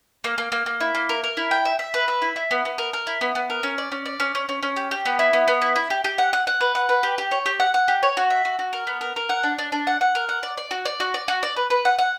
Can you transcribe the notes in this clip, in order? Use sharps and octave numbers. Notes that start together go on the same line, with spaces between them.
A#3
A#3
A#3
A#3
E4
A#3
A#4
A#4
E4
G5
E5
E5
B4
E5
E4
E4
B3
B3
A#4
A#4
E4
B3
B3
A#4
C#4
D5
C#4
D5
C#4
C#4
C#4
C#4
G4
G4
B3
E4
B3
B3
E4
E4
G4
G4
F#5
F#5
F#5
B4
F#5
B4
G4
G4
C#5
G4
F#5
F#5
G4
C#5
F#4
E5
F#4
F#4
A#4
B3
A#4
A#4
F#5
D4
D4
D4
F#5
F#5
A#4
F#5
D5
D5
F#4
D5
F#4
D5
F#4
D5
B4
B4
F#5
F#5